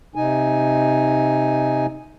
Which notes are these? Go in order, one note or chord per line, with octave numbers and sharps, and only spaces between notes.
C3 D#4 G#5